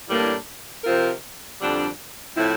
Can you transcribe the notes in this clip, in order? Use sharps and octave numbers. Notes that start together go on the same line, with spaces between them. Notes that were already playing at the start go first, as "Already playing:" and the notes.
A2 E3 G3 A#3 D4
C3 F3 C4 F4 A#4
F2 D3 G3 D4
A2 F3 C4 E4